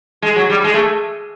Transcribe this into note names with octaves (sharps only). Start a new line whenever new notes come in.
G#3
F#3
G3
G#3
A3